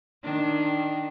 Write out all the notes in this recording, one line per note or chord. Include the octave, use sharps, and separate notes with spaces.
D#3 D4